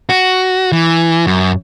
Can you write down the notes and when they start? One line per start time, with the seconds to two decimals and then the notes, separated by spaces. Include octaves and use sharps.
0.09 F#4
0.72 E3
1.27 F#2